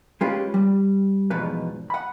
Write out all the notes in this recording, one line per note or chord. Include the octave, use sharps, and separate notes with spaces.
G#3 C#4 F4 G4 B4
G3
E2 G#2 B2 F3 B4
F#5 B5